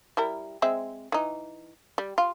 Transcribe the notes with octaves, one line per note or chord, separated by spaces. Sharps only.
G3 E4 A#4
G#3 C4 E5
E3 D#4
G3
F4